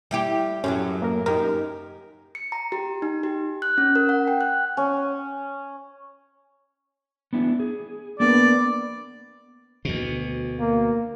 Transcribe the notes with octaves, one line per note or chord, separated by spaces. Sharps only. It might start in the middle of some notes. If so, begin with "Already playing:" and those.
G3 E4 G4
F#2 A2 F#3 C#4 G4
A#3 A#4
F#2 D#4 G4 A#4
C#7
A#5
G4
D#4
G4
F#6
C#4
A#4
F#5
G5
F#6
C#4
B3 D4 E4
G#4
A#3 B3 D4 A#4 D5
D2 B2
A#3